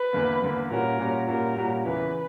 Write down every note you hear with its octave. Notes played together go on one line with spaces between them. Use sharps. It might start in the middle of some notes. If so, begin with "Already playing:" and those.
Already playing: B4
E2 D3 A#3
E2 D3 A#3
A#2 G3 C#4 F#4 A#4
A#2 G3 C#4 F#4
A#2 G3 C#4 F#4 A#4
A#2 G3 C#4 F#4
E2 C#3 E3 B4